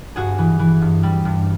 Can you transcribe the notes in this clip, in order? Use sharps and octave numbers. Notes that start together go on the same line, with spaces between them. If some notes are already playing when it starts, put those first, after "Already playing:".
G2 F#4 G#4
E3
E3
G2
G3
G2